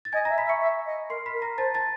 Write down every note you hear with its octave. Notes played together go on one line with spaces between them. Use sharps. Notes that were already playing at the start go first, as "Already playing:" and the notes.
A6
D#5 G#5 G#6
E5 A#5 A#6
B5 B6
E5
C#6 C#7
E5
D#5
A#4 C6 C7
B5 B6
A#4
A#5 A#6
C5 A5 A6
A5 A6